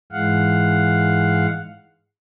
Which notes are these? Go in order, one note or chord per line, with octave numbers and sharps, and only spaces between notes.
G#2 E3 G#3 F5 F#5